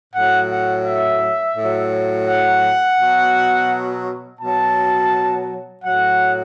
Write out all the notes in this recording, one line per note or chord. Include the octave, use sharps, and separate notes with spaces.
A2 F#3 F#5
F#5
E5
A2 F#3
F#5
B2 F#3
B2 F#3 A5
A2 F#3 F#5